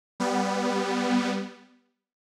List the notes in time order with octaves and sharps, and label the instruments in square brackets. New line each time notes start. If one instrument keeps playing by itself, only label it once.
[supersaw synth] G3 B3